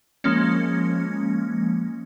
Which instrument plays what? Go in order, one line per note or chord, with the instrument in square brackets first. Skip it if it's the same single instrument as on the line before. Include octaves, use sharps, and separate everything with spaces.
[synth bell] F3 G#3 A#3 C#4